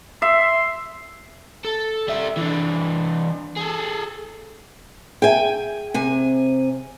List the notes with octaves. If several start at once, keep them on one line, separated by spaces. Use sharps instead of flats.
E5 C6
A4
G3 E5
E3 D4
G#4 A4
G#4 E5 G5 G#5
C3 G#5